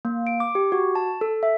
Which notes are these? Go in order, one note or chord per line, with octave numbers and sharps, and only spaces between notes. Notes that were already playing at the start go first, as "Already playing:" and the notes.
A#3
D7
D6
G4
F#4
A5
A4
E5